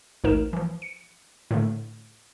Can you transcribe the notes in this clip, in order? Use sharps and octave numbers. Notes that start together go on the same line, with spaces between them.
A1 D2 G#2 D#4 A#4 E7
E3 F3
C#7
A2 D3 A3